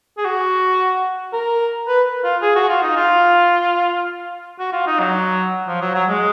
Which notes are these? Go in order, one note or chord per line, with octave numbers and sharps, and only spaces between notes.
G#4
F#4
A#4
B4
F4
G#4
F#4
F4
D#4
F4
F#4
F4
D#4
F#3
F3
F#3
F#3
G#3